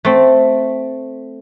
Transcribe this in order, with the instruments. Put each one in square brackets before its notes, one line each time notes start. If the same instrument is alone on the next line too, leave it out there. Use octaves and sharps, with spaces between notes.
[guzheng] A3 C4